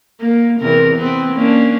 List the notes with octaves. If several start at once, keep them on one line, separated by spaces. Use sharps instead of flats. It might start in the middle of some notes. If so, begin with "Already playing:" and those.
A#3
E2 C3 A#4
B3 C4
A#3 C#4 D4